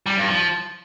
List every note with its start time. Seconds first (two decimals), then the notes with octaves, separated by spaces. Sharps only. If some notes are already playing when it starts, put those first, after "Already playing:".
0.06 G3
0.17 G2
0.28 F3